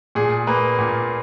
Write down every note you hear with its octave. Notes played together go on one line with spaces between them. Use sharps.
A#2 G#4
A#3 B4
A#2